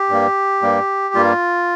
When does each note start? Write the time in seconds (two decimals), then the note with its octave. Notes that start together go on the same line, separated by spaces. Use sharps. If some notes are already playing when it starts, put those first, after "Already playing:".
Already playing: G4
0.09 G2 G3 A#3
0.62 G2 G3 A#3
1.14 G2 G3 A#3 F4